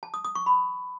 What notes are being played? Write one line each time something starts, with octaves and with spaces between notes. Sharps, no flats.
A5
D#6
D#6
C#6
B5